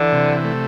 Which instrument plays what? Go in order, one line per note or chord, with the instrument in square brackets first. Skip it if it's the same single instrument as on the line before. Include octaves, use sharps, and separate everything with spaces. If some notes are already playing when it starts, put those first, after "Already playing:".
Already playing: [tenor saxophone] D3 [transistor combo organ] E3
[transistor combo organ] C3
A3